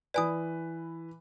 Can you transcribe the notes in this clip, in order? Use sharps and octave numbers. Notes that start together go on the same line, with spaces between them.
E3 B4 D5 G#5 D#6